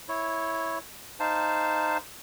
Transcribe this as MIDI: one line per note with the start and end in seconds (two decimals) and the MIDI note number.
0.09 0.79 64
0.09 0.79 73
1.20 1.98 63
1.20 1.98 72
1.20 1.98 77
1.20 1.98 81